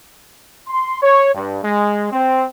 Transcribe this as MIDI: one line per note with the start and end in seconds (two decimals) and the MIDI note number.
0.68 1.02 84
1.03 1.32 73
1.35 1.58 43
1.64 2.08 56
2.12 2.44 60